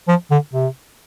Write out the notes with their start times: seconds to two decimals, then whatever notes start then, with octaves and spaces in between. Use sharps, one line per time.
0.08 F3
0.31 D3
0.53 C3